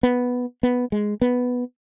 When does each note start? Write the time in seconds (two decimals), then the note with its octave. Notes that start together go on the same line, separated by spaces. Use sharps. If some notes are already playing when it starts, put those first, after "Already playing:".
0.03 B3
0.63 B3
0.92 G#3
1.21 B3